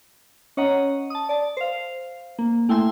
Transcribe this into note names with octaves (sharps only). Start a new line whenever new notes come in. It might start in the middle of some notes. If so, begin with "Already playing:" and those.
C#4 C#5 D#5 F#5 A#5
A5 D#6
D5 A5
C5 F5
A#3
A3 E4 G5 G#5 C6 E6